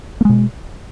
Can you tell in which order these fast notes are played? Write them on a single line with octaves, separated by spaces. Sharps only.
A#3 G#3 B2